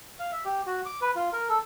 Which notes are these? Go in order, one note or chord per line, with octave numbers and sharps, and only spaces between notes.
F5
E5
G4
F#4
D6
B4
F4
A#4
A4